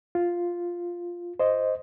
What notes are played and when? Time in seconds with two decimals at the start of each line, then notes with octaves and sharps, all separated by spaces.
0.15 F4
1.39 C5 D#5